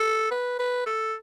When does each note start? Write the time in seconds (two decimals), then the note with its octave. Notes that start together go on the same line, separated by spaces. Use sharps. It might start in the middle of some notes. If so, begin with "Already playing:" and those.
Already playing: A4
0.31 B4
0.59 B4
0.86 A4